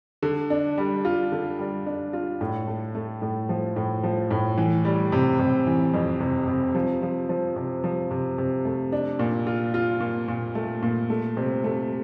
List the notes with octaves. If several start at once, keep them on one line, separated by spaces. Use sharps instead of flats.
D3
D4
G3
F4
D3
G3
D4
F4
A2
A3
A3
A2
F3
A2
F3
A2
E3
G3
C3
C3
E3
F2
C3
C3
F3
F3
F3
C3
F3
C3
C3
A3
D4
A#2
F4
F4
A#2
A#2
A3
A#2
A3
C3
A3